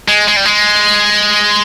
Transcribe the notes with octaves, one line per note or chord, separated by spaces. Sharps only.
G#3
G#3
G3
G#3